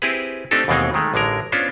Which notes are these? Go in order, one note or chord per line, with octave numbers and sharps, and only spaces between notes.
C4 E4 G4 G#4 B4
A3 C4 D4 D#4 G4 A4
D#2 B2 E3 G#3 C4 D#4
D#3 G#3 A3
A1 D3 G#3 A#4
B3 C#4 D4 F4 C5